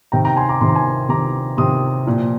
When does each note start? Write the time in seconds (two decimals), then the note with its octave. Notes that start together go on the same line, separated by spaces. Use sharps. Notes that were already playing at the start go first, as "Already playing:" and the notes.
0.12 C3 D#3 G5 A#5
0.25 G5 A#5
0.37 G#5 C6
0.49 A#5 D6
0.61 C3 D#3 C6
0.69 A#5
0.75 G#5 C6
1.09 C3 D#3 A#5 D6
1.57 C3 D#3 C6 D#6
2.06 A#2 F3